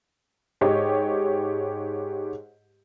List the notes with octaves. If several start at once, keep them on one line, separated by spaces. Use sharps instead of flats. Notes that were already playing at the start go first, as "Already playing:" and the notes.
G#2 G4 C#5 D#5